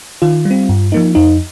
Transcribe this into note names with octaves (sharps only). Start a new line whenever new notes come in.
D#3 F4
G3
C4
G2
F3 A#3 D#4
F2 D#4